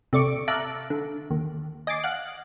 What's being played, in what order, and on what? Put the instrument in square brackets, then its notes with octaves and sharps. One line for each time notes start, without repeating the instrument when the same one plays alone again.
[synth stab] C3 A3 D5 C#6 D7
E5 F5 A5 A#5 D6 F#6
D3
D#2
D#5 G#5 D6 A6 C7
F5 F#5 F#6